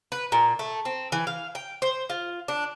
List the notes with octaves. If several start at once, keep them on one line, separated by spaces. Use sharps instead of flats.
B4
A#2
A3
C4
E3
F5
G5
C5
F4
D4